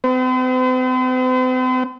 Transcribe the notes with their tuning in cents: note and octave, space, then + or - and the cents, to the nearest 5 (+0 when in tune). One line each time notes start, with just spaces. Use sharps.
C4 -40 C5 -45